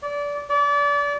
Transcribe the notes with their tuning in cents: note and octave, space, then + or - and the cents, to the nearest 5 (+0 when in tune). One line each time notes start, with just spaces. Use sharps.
D5 -25
D5 -30